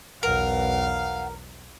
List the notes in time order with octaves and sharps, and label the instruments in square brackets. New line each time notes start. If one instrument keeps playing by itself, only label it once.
[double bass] B1 E2 [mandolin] A#4 [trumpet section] F5 [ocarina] F#5